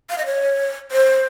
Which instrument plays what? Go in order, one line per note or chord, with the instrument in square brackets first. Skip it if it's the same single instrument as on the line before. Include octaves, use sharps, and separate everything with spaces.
[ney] F5
D#5
C#5
C5